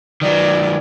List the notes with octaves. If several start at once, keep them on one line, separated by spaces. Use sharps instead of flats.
D#3 F#3 D5